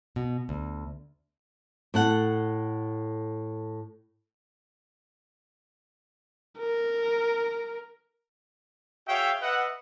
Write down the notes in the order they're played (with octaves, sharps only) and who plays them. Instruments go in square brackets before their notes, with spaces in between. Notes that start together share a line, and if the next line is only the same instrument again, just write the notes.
[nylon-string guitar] B2
D2
A2 A4 F#5
[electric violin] A#4
[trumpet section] F#4 G#4 C#5 E5 F5 G5
B4 D#5 E5 F#5